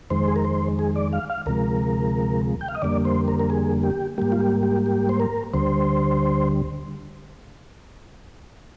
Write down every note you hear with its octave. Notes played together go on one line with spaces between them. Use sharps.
F2 D#3 G#3 C5
G#4
A#4
C5
G#4
D5
F5
F5
D2 C3 F3 G#3 A#4
G5
F5
D#5
F2 D3 G3 A#3 D5
C5
A#4
A#4
G#4
G4
G#2 G3 A#3 G4
F4
G4
G4
G4
C5
A#4
D2 D3 G3 C5